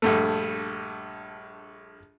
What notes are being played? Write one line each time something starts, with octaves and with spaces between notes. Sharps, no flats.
A#1 G2 A3